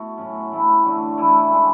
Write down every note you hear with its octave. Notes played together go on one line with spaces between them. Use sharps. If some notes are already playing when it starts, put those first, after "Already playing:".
Already playing: A3 B3 E4 F#4
A2 F#3 C#4
E3 A3 E4
D3 A3 D4 F#4
E3 A3 E4
C#3 E3 G#3 D4